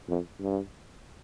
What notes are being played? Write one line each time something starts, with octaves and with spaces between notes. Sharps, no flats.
F2
G2